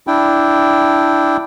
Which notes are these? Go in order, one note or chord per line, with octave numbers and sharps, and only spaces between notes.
D4 E4 G5